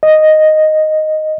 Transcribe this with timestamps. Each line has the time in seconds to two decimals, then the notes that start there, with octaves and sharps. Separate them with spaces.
0.03 D#5